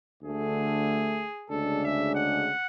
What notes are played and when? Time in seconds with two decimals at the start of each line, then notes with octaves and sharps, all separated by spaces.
0.23 D2 D3 A3 G#4
1.50 D2 C#3 G#3 D4 A4
1.83 E5
2.14 F#5